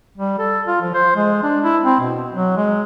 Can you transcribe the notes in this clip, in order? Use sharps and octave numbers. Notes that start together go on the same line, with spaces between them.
G3
A4
F4
F3
C5
G#3
D4
E4
C4
B2
F#3
G#3